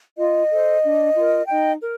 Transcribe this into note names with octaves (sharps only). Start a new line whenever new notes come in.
F4 D#5
A4 C5
D4
F4 A#4
D#4 D#5 G5
A#4